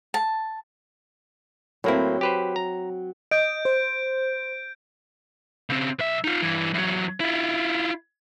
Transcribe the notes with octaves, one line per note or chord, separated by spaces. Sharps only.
A5
A2 F#3 A#3 C4 E4
G4 B4 C5
A#5
D#5 G6 D7
C5
C#3 C4
B1 E5
D#4 F4
G2 E3
E2 F#3
E4 F4